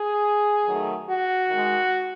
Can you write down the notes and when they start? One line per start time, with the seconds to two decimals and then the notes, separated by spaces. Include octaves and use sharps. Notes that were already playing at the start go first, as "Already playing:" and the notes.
Already playing: G#4
0.66 D#3 F#3 A3
1.07 F#4
1.49 D#3 G#3